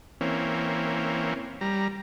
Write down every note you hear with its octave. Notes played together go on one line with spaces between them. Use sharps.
E3 A#3 C4 C#4
G3 A#5